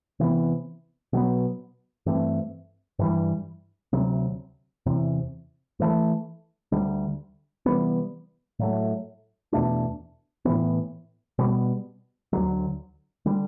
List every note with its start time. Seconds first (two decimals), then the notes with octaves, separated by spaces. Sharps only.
0.20 C3 E3 B3
1.13 B2 F#3 B3
2.06 G2 E3 A3 C4
2.99 G2 E3 G3
3.93 D2 C3 F#3
4.86 E2 C3 E3
5.80 G2 E3 A3
6.72 D2 D3 G3
7.66 C3 E3 G3 B3
8.59 A2 F#3 A3
9.52 E2 B2 A3 D4
10.45 A2 E3 B3
11.38 B2 G3 B3
12.33 D2 D3 F#3
13.26 D3 G3